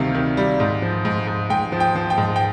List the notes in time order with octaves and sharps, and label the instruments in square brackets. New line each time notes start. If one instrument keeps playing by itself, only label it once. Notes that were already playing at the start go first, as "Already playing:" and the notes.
Already playing: [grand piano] D2 C3 D#3 G3 F5
D#3
G3
G#2
F3
G#2
G#2
G#2 G5
F3
G5
F3
G5
G#2
G5